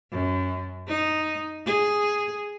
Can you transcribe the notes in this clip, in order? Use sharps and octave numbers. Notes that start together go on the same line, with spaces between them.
F#2
D#4
G#4